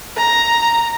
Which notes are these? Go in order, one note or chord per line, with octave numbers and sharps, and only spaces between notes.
A#5